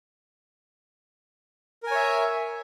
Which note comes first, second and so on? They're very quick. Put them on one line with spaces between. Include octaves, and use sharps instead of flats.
A#4 G#5 C#5 E5